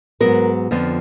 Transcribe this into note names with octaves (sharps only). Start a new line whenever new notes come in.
G#2 F#3 B3 A#4
F2 D3 F3 B3